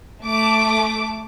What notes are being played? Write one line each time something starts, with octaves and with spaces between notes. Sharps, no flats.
A3 D6